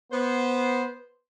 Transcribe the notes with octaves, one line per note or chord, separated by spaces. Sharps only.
B3 C5